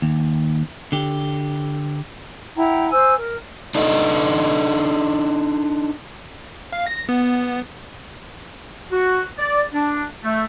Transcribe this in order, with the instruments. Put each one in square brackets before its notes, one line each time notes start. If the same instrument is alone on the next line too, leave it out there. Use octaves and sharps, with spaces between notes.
[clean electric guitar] D#2
D3 G4
[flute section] E4 F#5 G5 A#5
C5 G#5 E6
A#4
[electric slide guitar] D4 D#4 A4 D#5
[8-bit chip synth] F5
A#6
B3
[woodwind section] F#4
D5
D4
A3